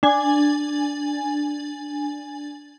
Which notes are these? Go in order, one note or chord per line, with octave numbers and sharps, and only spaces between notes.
D4 G#5